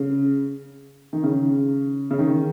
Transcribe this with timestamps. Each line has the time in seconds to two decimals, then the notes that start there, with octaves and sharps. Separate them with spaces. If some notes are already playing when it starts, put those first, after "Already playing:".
Already playing: C#3
1.13 D#3
1.23 C#3
2.11 C#3
2.19 D#3